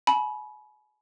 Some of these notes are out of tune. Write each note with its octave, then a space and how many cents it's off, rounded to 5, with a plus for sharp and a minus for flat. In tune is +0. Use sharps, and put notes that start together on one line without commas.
G#5 +40 B5 -20